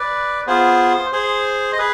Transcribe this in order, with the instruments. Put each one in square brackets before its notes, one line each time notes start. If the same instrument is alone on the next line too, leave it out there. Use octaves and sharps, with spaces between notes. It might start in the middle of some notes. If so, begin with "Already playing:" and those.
Already playing: [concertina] B4 D5
B3 F4 G#4 C5
G#4 C5
D#5
G#4 B4